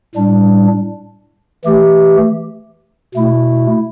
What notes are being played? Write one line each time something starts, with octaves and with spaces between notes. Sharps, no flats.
A2 G3 D4
E3 A3 G4
B2 A3 E4